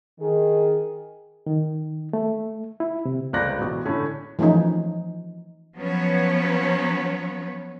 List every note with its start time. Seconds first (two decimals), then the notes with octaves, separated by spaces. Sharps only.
0.21 D#3 G#4
1.46 D#3
2.13 A3
2.80 E4
3.05 C3
3.33 G1 C#2 C5 D5 F#6 A#6
3.59 A1 B2
3.86 A2 D3 A3 C#4
4.39 E3 F3 A3 C#4 D#4
5.76 F3 F#3 B3 C#4 B4 C#5